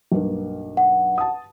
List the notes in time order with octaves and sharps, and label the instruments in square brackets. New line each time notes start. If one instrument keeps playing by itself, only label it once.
[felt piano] B1 G2 A#3
[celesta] F#5
[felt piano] A5 D#6